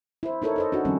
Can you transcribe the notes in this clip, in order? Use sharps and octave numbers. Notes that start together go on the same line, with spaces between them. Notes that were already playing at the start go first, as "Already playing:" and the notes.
E4 C5
D#4 E4 A4 A#4 C#5
A4 C5 D#5
D4 D#4 F#4
D#3 F3 G3 C4 C#4